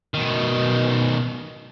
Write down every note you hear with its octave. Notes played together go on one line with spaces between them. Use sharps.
B2 D#3